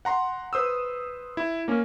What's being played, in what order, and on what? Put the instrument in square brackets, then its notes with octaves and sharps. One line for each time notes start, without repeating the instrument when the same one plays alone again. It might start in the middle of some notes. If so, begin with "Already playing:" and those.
[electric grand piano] F#5 A#5 C6
B4 C5 D#6 E6
E4
A#3 C#4